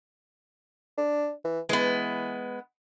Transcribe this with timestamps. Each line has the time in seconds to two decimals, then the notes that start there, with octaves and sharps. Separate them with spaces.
0.97 D4
1.44 E3
1.69 E3 G#3 B3